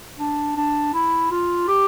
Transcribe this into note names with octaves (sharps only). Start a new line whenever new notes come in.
D4
D4
E4
F4
G4